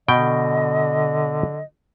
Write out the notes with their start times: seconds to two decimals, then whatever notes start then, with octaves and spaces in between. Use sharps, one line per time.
0.08 B2 D3 D#5 G5